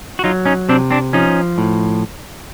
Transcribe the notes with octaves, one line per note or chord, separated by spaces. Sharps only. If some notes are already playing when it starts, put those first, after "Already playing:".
F#4
F#3 D#4 F4
C#4 D#4
C3 C4 D4
C4 D4
F3 C#4 D#4
A2